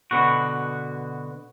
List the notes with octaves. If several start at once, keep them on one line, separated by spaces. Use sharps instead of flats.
B2 D3 F#4